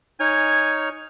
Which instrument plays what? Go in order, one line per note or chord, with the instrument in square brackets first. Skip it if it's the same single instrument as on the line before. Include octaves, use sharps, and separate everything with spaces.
[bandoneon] D#4 C#5 F6 [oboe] G#5